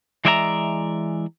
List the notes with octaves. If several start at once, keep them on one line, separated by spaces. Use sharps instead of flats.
E3 G#3 D5 E5 G5 A#5